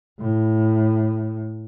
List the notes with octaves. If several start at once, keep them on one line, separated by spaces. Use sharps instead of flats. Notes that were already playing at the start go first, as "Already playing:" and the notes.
A2